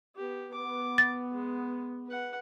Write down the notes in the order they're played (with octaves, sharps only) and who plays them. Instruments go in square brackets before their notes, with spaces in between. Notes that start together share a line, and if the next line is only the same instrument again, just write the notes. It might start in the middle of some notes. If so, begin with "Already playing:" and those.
[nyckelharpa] B3 G4
[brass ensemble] B3 [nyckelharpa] D6
[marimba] A6
[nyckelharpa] G#3
B4 F#5